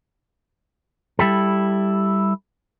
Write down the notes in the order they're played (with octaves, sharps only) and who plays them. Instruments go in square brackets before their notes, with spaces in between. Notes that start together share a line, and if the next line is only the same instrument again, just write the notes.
[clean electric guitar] G3 E4 G4 A4